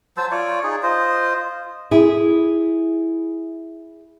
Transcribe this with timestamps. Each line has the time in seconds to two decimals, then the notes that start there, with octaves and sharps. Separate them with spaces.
0.17 F#3 C5 A5 E6
0.31 F4 C#5 D5
0.64 D#4 G#4
0.83 F4 C5 D#5
1.91 E4 G#4